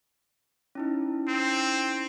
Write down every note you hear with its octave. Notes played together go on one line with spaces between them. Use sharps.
C#4 D#4 E4
C4